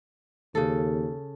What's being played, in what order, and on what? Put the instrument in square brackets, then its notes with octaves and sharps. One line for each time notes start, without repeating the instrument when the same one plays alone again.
[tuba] D#2 [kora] C#3 A4